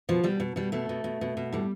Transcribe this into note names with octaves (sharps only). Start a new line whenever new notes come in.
B2 F3
B2 G3
B2
B2 G3
B2 A3
B2
B2
B2
B2
A2 G3